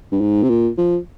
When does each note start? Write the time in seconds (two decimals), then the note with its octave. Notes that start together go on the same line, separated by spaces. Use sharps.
0.12 G2
0.21 G#2
0.43 C3
0.49 A#2
0.78 F3